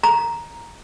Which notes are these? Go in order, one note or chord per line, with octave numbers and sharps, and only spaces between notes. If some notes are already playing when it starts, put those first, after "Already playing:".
A#5